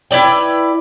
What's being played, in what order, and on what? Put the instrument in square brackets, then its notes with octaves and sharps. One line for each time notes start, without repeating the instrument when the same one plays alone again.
[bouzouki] E4 B4 D5 G5